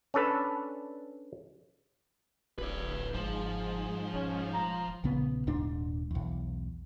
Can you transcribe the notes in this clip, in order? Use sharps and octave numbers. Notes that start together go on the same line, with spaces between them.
C#4 D4 A4 B4
D1 A1 B4 D5
G1 G#2 F3 G#4
E1 C#4
A#5
A#1 C#3 B3
D#1 G#2 D4
B1 E2